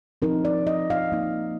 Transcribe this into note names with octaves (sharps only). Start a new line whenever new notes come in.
F3 C4 D#4 A#4
D5
D#5
F5
F3 A#3 D#4